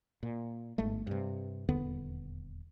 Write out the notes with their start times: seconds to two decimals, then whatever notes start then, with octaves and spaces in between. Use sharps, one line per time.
0.23 A#2
0.78 G1 G#2 G#3 A3
1.07 G2 C3
1.68 D#1 E2 D3 B3